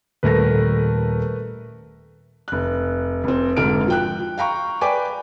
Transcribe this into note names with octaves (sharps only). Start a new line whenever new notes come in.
D#1 A3 A#4 B4 A#6
F1 F#6
F1 C4
F1 G#2 D3 F#4 F6 D7
F3 G5 F#6
F5 G5 A#5 C#6
B4 D5 G5 G#5 D6